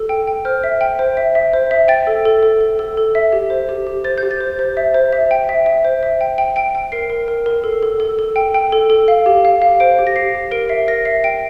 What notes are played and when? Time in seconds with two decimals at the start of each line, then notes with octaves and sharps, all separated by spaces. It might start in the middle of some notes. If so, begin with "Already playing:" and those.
Already playing: A4
0.09 G5
0.27 G5
0.45 C5 F6
0.64 E5
0.81 G5
0.99 C5
1.17 E5
1.35 E5
1.53 C5
1.71 E5
1.88 G5 A6
2.07 A4
2.25 A4
2.43 A4
2.61 A4
2.79 A4
2.97 A4
3.15 E5
3.33 G4
3.50 C5
3.69 G4
3.87 G4
4.04 C5 A6
4.18 G6
4.23 G4
4.31 A6
4.40 C5
4.59 C5
4.77 E5
4.94 C5
5.13 E5
5.31 G5
5.49 E5
5.66 E5
5.85 C5
6.03 E5
6.21 G5
6.38 G5
6.56 G5 D7
6.75 G5
6.92 A#4 C7
7.10 A#4
7.28 A#4
7.46 A#4
7.64 A4
7.83 A4
8.00 A4
8.19 A4
8.36 G5
8.54 G5
8.72 A4
8.90 A4
9.08 F5
9.26 G4
9.45 F5
9.62 F5
9.80 C5 D7
9.99 G4
10.07 A#6
10.16 G4 C7
10.35 G4
10.51 A#4 D7
10.69 E5 C7
10.88 A#4 A#6
11.05 E5 C7
11.24 G5 D7